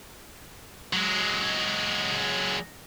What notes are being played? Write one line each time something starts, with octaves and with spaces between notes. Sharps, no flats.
F#3 G#3